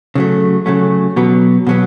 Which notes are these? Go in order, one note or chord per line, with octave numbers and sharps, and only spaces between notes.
C#3 F#3 A3
C#3 F#3 A3
B2 F#3 B3
B2 F#3 B3